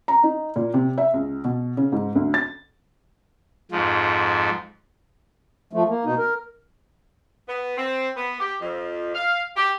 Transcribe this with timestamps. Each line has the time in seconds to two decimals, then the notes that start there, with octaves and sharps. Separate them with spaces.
0.08 A#5
0.23 D#4
0.56 A#2
0.74 C3
0.98 E5
1.14 C#2
1.44 B2
1.77 C#3
1.92 G#2
2.15 D2
2.34 A6
3.72 F2 G#2 F3
5.73 F3 A3
5.88 A#3
6.05 B2 D#4
6.18 A#4
7.48 B3
7.78 C4
8.17 B3
8.40 G4
8.61 F2
9.15 F5
9.56 G4